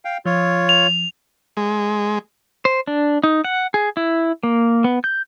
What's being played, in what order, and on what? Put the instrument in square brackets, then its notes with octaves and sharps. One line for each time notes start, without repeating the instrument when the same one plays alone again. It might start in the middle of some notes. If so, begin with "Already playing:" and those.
[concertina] F5 G5
[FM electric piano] F3 [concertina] F4 C#5
[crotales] F7
[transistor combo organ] G#3
[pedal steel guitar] C5
D4
D#4
F#5
G#4
E4
A#3
B3
G6